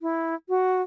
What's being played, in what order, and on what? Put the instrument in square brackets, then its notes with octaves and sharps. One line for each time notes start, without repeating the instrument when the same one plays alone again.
[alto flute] E4
F#4